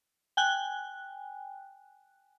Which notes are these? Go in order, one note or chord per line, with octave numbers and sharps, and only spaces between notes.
G5 G#5 F#6